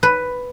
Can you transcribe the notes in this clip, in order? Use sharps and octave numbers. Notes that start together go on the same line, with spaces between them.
B4